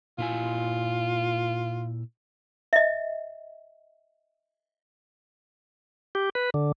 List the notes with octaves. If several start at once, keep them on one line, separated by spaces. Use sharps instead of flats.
A#2 E4 F4 G#5
D#5 E5
G4
B4
D3